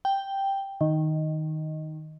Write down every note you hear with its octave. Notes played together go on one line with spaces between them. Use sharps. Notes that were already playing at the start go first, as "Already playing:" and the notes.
G5
D#3